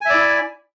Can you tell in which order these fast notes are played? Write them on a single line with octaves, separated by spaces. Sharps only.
G#5 E5 D5 E4